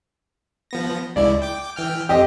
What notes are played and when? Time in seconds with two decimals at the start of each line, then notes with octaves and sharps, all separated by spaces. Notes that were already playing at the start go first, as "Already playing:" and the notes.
0.71 F3 B3 A#6
1.16 C#2 G#3 E4 D5
1.42 G5 D6
1.76 E3 G5 F6
2.09 F2 C4 G4 D#5